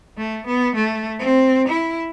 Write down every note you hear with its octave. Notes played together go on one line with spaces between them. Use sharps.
A3
B3
A3
C4
E4